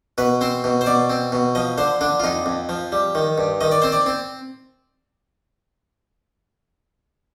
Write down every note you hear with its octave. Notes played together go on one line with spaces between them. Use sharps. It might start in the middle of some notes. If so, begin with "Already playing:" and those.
B2 B4
C4 C5
B2
C5
B2 D5
C4
B2
F3 D#5
D3 C5
D3 D4
F4
F2 D#4
F2
F3
G3
D#3
G2
D#3 D#5
D5
C4 C5
D5
C4